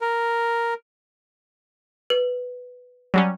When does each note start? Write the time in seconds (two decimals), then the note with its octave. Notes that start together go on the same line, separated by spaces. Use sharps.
0.01 A#4
2.10 B4
3.14 F#3 G3 C#4